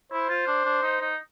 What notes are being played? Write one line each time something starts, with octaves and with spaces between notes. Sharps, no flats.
E4 C5
F4
D4
D4
D#4
D#4